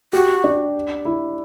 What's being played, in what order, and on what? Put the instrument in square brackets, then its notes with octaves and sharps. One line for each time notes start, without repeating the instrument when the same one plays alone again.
[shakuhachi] F#4 [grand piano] G4
[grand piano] D4
E4